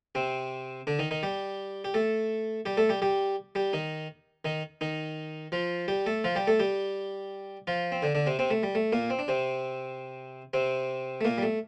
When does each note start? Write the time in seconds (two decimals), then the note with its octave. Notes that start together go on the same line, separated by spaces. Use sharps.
0.15 C3 C4
0.87 D3 D4
0.99 D#3 D#4
1.11 D#3 D#4
1.23 G3 G4
1.84 G4
1.94 A3 A4
2.66 G3 G4
2.77 A3 A4
2.89 G3 G4
3.02 G3 G4
3.55 G3 G4
3.73 D#3 D#4
4.45 D#3 D#4
4.81 D#3 D#4
5.52 F3 F4
5.88 G3 G4
6.06 A3 A4
6.24 F3 F4
6.35 G3 G4
6.47 A3 A4
6.59 G3 G4
7.67 F3 F4
7.92 C4
8.02 D3 D4
8.15 D3 D4
8.26 C3 C4
8.39 C3 C4
8.51 A3
8.63 G3
8.75 A3
8.93 A#2 A#3
9.10 C4
9.19 D4
9.28 C3 C4
10.53 C3 C4
11.21 A3
11.25 A#2 A#3
11.38 G3
11.43 A3